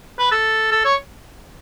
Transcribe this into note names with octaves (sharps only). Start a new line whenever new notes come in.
B4
A4
A4
C#5